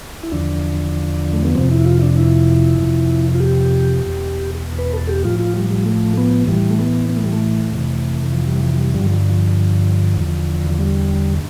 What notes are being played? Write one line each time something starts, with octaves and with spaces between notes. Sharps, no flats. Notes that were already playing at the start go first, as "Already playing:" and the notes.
E4
E2 D3 F3 D4
A3
B3
F2 C3 F3 C4
E4
F4
E4
D4
E4
F2 C3 F3
F4
G4
E2 B2
B4
A4
G4
A2 F3 F4
F4
G3
G3
A3
B3
A2 E3 G3
A3
B3
B3
A3
G3
A3
F2 C3 E3
F3
G3
F3
F3
G3
G2 D3 F3 G3
F3
F3
E2 D3 F3
F3
G3